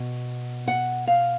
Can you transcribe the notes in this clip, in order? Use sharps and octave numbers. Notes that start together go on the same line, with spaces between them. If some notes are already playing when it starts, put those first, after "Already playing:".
Already playing: B2
F#5
F5